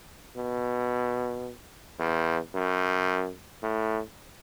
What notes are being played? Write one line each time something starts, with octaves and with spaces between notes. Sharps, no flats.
B2
E2
F#2
A2